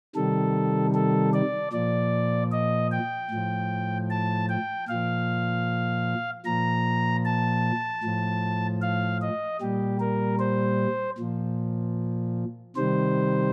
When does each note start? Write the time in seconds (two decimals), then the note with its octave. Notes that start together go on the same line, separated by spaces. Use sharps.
0.15 C3 D#3 G3 A4
0.95 A4
1.34 D5
1.73 A#2 F3 D5
2.52 D#5
2.92 G5
3.31 A2 F3
4.10 A5
4.49 G5
4.89 A#2 F3 F5
6.45 A#2 F3 A#5
7.25 A5
8.04 A2 F3
8.82 F5
9.21 D#5
9.61 A#2 G3 G4
10.00 A#4
10.39 C5
11.18 A#2 F3
12.76 C3 D#3 G3 C5